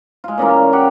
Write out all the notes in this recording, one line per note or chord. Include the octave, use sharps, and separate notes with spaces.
G#3 F4
A#2 C#3 E3 A#3
C#5
G4 C#5 F#5